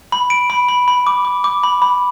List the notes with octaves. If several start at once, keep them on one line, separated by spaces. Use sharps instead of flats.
B5
D7
B5
B5
B5
D6
D6
D6
B5
B5